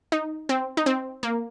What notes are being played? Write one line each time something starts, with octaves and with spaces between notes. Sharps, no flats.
D#4
C4
D#4
C4
A#3